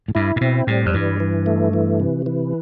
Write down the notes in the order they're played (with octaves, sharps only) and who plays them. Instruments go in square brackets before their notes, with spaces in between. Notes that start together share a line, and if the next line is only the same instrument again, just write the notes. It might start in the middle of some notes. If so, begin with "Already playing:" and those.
[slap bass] A2
[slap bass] G2 [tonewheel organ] E4
[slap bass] A2
[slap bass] B2 [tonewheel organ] C4
[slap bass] A2 [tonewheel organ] G3
[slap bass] F2
[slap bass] G2 [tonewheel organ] E3
[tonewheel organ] E3
A3
E3
C3
E3